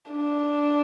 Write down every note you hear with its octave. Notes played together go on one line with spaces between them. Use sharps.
D4